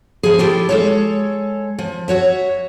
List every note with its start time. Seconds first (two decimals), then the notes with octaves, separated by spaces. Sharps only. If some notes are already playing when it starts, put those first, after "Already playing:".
0.23 F3 G#4
0.38 E4 F4 G4 A4
0.69 G#3 A4 C#5
1.78 F3
2.08 F#4 C#5 E5